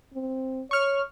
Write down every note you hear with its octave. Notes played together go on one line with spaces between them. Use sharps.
C4
C#5 C#6 F6